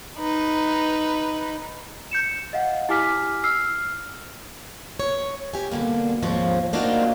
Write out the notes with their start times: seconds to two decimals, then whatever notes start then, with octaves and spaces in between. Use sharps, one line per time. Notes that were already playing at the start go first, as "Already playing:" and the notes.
0.18 D#4 B4
2.11 G6 C#7 E7
2.53 D#5 F5 F#5
2.89 E4 G4 G#5 D6 F6 B6
3.44 E6 F6 C7
4.99 C#5
5.54 G4 G#5
5.71 B2 D3 F3 G3 A#3
6.22 D#2 G#2 F3 C4 C#5
6.73 A#3 D4 D#4 F4 F#4 C5